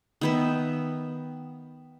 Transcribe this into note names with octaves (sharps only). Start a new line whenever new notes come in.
D#3 B3 E5